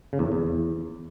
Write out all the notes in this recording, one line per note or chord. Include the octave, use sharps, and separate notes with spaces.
C#3
E2
A2
E2